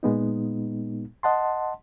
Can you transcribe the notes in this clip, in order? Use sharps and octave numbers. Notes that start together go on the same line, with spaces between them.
A#2 G#3 B3 D#4
D#5 F#5 A5 C6